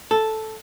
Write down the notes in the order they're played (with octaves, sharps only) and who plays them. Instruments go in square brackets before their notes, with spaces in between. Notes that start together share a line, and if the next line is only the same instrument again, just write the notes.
[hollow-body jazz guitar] A4